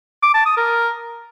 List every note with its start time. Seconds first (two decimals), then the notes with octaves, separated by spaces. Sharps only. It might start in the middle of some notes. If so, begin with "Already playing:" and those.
0.22 D6
0.34 A5
0.45 D#6
0.57 A#4